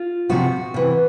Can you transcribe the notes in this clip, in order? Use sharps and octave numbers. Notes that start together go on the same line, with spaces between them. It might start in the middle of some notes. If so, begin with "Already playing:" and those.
Already playing: F4
C3 F3 F#4
C3 E3